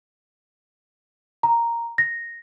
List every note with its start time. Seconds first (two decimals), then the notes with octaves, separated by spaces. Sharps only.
1.43 A#5
1.98 A#6